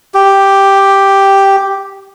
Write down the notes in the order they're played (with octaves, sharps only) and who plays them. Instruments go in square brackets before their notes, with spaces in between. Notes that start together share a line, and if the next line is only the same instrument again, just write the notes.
[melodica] G4